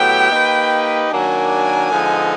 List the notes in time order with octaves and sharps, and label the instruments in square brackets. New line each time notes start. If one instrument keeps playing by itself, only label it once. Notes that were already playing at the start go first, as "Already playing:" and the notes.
Already playing: [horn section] A2 F#3 B3 E4 G4 [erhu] G5
[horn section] A#3 D#4 G4 B4
[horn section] D#3 F#3 A#3 D4 [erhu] G#5
[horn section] D3 F3 G#3 B3 D#4